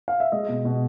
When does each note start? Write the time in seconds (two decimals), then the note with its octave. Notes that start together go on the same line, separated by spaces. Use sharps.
0.08 F5
0.20 E5
0.32 G#3 D#5
0.49 B2
0.65 B2